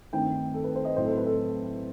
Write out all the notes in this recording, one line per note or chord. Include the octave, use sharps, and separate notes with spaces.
G2 D#3 A3 C4 G5
A4
B4
C5
D#5
A2 F#3 C4 C5
A4
B4
A4